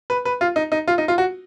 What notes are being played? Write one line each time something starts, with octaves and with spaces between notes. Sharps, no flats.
B4
B4
F4
D#4
D#4
F4
D#4
F4
F#4